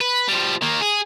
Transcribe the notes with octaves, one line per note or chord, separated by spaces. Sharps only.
B4
F3 G3
D#3 A#3
G#4